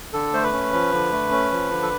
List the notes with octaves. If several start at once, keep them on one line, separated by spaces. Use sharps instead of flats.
D3 A4
A3 C5
B4
C#4
F3
D3
A3
C#4
F3
D3
A4